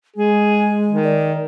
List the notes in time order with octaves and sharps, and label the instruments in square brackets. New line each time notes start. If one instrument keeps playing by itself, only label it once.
[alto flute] G#3 [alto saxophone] G#4
[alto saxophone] D#3
[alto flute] D5